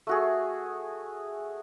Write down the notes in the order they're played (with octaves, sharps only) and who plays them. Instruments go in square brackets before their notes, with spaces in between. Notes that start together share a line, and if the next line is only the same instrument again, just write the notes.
[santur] A3 F#4 G#4